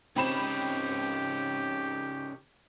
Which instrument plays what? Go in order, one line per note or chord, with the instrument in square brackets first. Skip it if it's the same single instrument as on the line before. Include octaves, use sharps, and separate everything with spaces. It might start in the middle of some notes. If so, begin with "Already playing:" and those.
[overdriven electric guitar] C#3 D#4 [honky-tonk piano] C4 B5 E7 [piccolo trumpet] G4